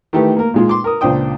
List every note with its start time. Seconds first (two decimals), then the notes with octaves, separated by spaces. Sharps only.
0.13 D#3 E3 A3 G4 B4
0.37 A#3 A#4
0.54 A#2 G#3 F4
0.69 C6 D6
0.84 A#4 D#6
1.01 C#2 A#2 D4 C5 G5 D#6